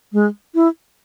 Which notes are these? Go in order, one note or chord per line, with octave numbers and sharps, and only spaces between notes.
G#3
E4